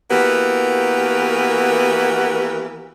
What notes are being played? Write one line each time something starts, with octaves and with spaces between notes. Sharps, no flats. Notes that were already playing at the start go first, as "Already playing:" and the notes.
E3 A#3 B3 F#4 G4 A#4